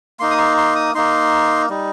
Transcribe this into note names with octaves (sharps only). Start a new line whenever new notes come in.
A#3 D#4 C6
D#6
C6
C6
D#6
A#3 D#4 C6
G3 D#4